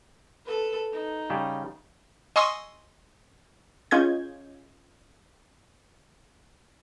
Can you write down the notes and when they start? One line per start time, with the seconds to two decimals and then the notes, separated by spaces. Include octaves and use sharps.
0.45 A4 B4
0.92 D#4
1.30 C#3 G3
2.36 D#5 G#5 C6 C#6 D#6 E6
3.91 C#4 F4 G#4 D#5 G6 G#6